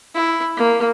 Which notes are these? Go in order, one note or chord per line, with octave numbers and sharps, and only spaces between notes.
E4
A#3